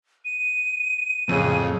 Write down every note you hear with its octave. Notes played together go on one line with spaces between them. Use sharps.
D#7
F2 A2 C#3